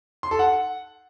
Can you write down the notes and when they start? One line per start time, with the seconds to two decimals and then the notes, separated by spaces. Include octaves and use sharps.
0.23 C6
0.31 A4
0.39 F#5